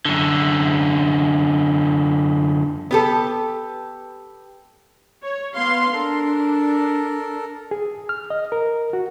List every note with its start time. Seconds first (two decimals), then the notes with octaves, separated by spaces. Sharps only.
0.05 F#2 D3
2.91 B3 G4 A4
5.22 C#5
5.55 B3 F5 C6
5.93 D4 A4 A#4
7.71 G#4
8.09 F6
8.30 D#5
8.52 A#4
8.93 F#4